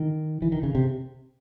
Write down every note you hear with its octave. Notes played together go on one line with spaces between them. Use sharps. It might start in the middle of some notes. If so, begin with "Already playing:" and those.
Already playing: D#3
E3
D#3
C#3
C3